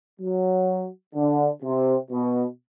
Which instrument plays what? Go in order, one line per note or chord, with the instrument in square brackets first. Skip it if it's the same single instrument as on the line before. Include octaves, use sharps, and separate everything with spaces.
[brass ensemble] F#3
D3
C3
B2